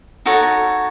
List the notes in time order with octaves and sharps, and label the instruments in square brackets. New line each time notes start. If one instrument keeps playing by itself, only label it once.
[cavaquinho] D#4 F#4 A4 C#5